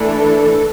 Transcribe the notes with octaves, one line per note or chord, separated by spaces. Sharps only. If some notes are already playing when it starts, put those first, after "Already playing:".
Already playing: E3 A3 D4 A4